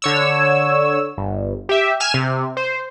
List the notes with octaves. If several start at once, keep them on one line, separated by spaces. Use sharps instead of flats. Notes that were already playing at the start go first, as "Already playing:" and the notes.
D3 C#5 E6
G1
G4 E5
G#5 F6 E7
C3
C5